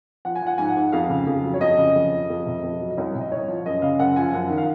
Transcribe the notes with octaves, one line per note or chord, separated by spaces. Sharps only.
F3 F#5
G#5
F3 F#5
G#2 G#5
F#5
G#2
F2 F5
C#3
F2
F#3
C#5
F2 D#5
C#3
F2
F3
F2
C3
F2
F#3
D#5
C2 C#5
C3
D#5
C2 C#5
F3
F#2 D#5
C#3 F5
F#2 F#5
F3 G#5
F#2 F#5
D#3
F5